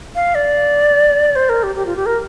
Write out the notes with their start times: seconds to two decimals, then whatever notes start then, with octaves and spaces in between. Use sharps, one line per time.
0.15 F5
0.35 D5
1.36 C5
1.49 A#4
1.63 G4
1.75 G4
1.86 F4
1.96 G4
2.06 A#4